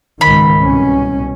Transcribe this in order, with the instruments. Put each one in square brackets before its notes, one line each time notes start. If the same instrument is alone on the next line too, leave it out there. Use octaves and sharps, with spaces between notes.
[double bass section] C#2 G#2 D#3 [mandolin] B5
[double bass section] C2 B2 C#4